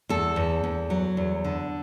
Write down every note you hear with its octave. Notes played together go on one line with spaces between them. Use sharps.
E2 A4
E2
E2
F#3
E2
D3